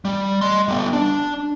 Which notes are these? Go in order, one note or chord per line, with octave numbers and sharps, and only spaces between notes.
G3
D#5 C6
G3 B3
D4